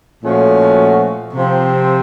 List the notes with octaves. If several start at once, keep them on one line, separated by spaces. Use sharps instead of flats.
A#2 F3 A3 C#4 F#4
C3 F3 C4